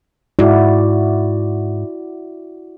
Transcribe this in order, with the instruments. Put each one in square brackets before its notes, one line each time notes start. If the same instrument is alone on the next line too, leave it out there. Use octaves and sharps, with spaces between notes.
[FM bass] G#2 [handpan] E4 F#4 D5